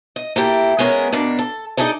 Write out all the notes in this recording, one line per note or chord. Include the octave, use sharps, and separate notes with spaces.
D#5
A#3 E4 G4 A4
G#3 B3 C#4 G#4 A#4
B2 A#3 D4
A4
D#4 E4 G#4 A4 D5